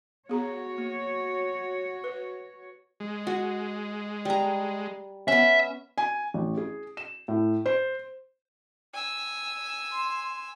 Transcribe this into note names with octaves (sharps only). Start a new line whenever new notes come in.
B3 F#4 G#4 C#5 A#5
A#3
B4
G#3
F#4
G3 A#5
B3 C#4 E5
G#5
A1
G#4
E7
A2
C5
G#5 E6
C6